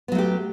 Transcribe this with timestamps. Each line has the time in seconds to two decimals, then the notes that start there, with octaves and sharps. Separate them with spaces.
0.08 B3
0.12 F#3
0.15 A3
0.18 G4